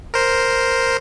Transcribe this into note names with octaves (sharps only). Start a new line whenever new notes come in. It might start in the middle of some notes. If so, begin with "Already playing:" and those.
A#4 C5